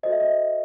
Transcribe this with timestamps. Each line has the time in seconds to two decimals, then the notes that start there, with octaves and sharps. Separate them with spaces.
0.03 F#4 A4 C5 D#5
0.12 E5
0.20 D#5